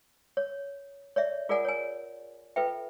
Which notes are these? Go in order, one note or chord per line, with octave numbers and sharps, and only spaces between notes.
C#5
C#5 D5 E5
F4 G#4 A#4 D5 F#5 G#5
C#5 G#5
F4 A4 B4 E5 G5